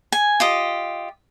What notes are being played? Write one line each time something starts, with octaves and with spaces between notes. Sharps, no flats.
G#5
F4 G4 D#5